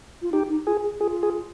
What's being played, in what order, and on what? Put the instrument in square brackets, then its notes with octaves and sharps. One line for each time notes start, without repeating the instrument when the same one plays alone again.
[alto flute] F4
[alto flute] D#4 [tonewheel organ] G4
[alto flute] D#4
[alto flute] F4 [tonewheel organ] G#4
[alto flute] G#4
[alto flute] F4 [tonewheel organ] G#4
[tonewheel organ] G#4